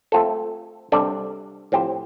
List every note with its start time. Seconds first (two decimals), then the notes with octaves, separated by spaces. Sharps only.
0.12 A3 C4 F4 A4
0.92 C3 G3 D4 A4 D5
1.72 A2 F3 C4 G4 C5